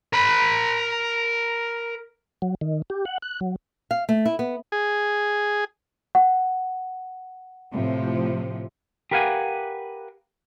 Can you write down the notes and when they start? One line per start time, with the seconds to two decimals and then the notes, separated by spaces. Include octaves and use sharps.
0.13 A#4 B5
2.42 F#3
2.61 D#3
2.90 G4
3.05 F#5
3.22 F#6
3.41 F#3
3.91 F5
4.09 A3
4.26 E4
4.39 B3
4.72 G#4
6.15 F#5
7.72 A2 C3 F3
9.11 G4 A#4 B4 F5 F#5 G#5